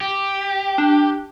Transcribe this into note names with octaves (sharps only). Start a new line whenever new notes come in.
G4
D4